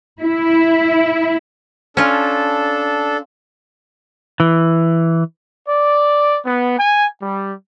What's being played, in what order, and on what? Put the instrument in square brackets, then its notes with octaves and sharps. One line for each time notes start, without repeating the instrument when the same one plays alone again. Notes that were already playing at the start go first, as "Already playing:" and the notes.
[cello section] E4
[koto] C#4 F4 [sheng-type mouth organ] D4 A4
[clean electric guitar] E3
[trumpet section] D5
B3
G#5
G3